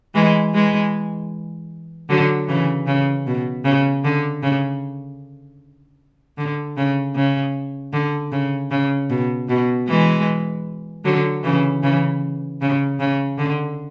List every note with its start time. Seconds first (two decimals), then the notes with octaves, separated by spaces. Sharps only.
0.15 E3 G#3
0.54 E3 G#3
2.10 D3 F#3
2.48 C#3 E3
2.87 C#3
3.27 B2
3.65 C#3
4.04 D3
4.43 C#3
6.38 D3
6.77 C#3
7.16 C#3
7.93 D3
8.32 C#3
8.71 C#3
9.10 B2
9.49 B2
9.88 E3 G#3
11.05 D3 F#3
11.43 C#3 E3
11.83 C#3 E3
12.61 C#3
13.00 C#3
13.38 D3